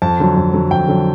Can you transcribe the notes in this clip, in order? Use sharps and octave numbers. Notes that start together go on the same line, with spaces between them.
F2 A5
D3 F#3
F2
D3 F#3
F2 G5
D3 F#3